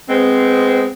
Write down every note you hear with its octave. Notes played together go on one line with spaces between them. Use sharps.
G#3 B3 C4